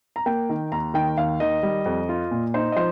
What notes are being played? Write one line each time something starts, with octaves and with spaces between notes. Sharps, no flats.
A#5
A#3 G5
D#3
D#2 A#5
D#3 G5
D#2 F5
D#3 D#5
G3
F2
F4
A#2
D#4 C5
D#5
F3 C5